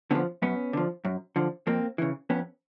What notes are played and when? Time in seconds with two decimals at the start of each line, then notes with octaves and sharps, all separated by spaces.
0.11 D3 F3 B3 C#4
0.42 F#2 B3 C#4
0.73 D3 F3
1.05 F#2
1.36 D3 F3
1.67 F2 A#3 C4
1.98 C#3 E3
2.30 F2 B3 C#4